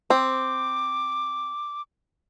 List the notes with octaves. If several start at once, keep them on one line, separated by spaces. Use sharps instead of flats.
C4 D6